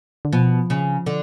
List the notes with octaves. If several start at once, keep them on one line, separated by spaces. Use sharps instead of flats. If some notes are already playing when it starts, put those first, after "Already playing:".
D3
B2 F3
C#3
D3